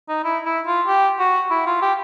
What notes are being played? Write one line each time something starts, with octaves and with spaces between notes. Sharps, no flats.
D#4
E4
E4
F4
G4
F#4
E4
F4
G4